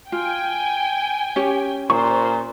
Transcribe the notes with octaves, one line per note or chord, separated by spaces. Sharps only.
F4 G5 G#5
C#4 G4 C#5
A#2 C5 C#6